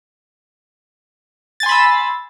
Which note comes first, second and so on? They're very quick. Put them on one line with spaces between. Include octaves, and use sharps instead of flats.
A6 G#5 C6 B5 E6